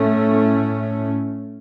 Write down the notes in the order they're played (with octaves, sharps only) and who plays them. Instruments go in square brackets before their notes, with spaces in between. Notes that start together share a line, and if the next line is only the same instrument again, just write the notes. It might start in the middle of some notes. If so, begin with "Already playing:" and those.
Already playing: [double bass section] A2 A3 C#4